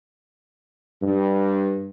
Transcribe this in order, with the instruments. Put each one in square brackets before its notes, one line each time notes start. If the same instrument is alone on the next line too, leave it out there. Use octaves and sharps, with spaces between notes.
[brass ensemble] G2